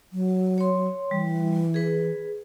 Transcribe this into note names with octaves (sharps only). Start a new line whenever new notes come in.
F#3
C#5 C6
E3 G3
G#4 B4